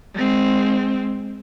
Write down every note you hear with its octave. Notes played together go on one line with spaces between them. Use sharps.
G#3 C4